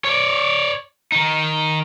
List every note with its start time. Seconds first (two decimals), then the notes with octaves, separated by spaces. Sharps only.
0.05 C#5 D5
1.12 D#3 D#4